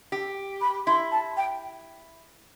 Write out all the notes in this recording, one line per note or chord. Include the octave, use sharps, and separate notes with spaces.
G4
B5
E4 C6
A5
G5